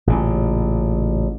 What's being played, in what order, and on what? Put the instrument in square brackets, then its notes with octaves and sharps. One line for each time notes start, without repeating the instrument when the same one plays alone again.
[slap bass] A1 A#2 C#3